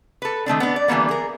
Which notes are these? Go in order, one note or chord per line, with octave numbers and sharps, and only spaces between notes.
A4 B4
D#3 A3 C4 D4
B3 D4
D5
D3 E3 G3 A#3 B3
G#4 A#4